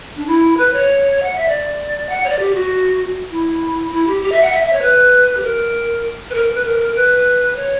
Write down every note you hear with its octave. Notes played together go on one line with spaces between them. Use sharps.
D4
E4
B4
C#5
F#5
E5
D5
F#5
C#5
D5
G4
F#4
E4
E4
G4
G4
E5
F#5
E5
E5
C#5
B4
G4
A#4
B4
A#4
B4
A#4
A#4
B4
C#5